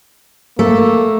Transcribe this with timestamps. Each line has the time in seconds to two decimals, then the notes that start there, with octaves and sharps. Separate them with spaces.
0.59 A3 A#3